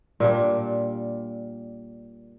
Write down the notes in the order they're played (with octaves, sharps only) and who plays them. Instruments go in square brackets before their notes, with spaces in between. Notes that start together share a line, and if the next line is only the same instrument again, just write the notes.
[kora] A#2 G3 D4